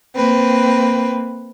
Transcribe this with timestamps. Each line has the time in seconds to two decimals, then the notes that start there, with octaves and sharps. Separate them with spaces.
0.15 A#3 C4 B4